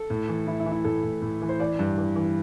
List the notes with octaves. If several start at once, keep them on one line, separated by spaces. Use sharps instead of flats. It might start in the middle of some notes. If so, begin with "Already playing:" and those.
Already playing: A4
A2
E3
E3 E4
E4
E3
E4
A2 A4
A2
A2
E3
C5
E3 D5
G2
E3
E3